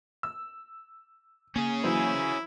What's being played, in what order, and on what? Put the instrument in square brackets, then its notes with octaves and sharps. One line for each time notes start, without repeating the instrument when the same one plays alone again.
[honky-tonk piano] E6
[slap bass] A#3 [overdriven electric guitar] C#4 G#4
[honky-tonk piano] E3 F#3 C5 [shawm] E4